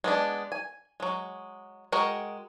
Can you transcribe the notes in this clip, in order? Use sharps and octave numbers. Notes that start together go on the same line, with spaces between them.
G#3 B3 D4
G#5
F#3 G#3
G#3 F#4 A#4 G5